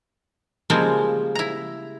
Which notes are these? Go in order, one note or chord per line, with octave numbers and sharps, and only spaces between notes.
C#3 F3 G3 G#3 A#3 C4
E4 A#5